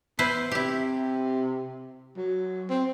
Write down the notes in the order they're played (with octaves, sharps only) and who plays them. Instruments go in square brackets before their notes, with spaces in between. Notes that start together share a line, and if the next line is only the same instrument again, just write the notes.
[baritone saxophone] B3 [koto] E4 B4 C5
[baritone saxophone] C3 [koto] E4 G4
[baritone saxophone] F#3
C4